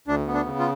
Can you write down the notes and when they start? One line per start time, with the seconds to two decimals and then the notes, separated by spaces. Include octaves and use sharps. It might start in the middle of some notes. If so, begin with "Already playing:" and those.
0.07 D2 D4
0.27 B3
0.34 D4
0.46 C#3
0.59 F4